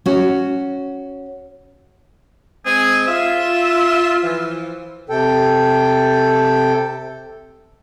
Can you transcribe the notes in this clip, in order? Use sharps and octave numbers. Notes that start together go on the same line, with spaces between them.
C#4 F#4
G#3 C4 G#4
F4 E5
E3 F3
C3 A4 G5